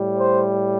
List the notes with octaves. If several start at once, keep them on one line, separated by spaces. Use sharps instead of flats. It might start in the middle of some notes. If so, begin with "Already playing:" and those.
Already playing: A2 G3
C5